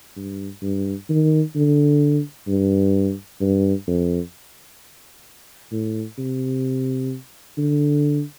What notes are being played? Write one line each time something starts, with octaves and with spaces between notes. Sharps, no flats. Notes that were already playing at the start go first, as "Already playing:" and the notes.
G2
G2
D#3
D3
G2
G2
F2
A2
C3
D3